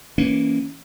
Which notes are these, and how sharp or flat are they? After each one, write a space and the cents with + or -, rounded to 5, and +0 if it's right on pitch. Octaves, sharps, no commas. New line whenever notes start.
E3 +0 A#3 +0 C#4 +0